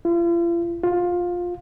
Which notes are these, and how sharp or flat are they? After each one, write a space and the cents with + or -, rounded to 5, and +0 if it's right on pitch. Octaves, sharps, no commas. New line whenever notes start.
F4 -45
F4 +15